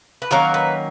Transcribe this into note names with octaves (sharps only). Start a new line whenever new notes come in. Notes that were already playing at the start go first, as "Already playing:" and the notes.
B4
D#3 F#3 A#3 C#4 A#4
B4